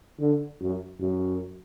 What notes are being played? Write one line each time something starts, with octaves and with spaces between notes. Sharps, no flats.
D3
F#2
F#2